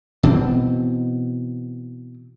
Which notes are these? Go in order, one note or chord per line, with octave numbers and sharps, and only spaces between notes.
B2 E3 C4